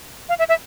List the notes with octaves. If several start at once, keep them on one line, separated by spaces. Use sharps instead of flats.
F5
E5
E5